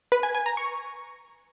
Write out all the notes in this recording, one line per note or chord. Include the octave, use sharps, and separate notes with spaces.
B4
G#5
G#5
A#5
C#6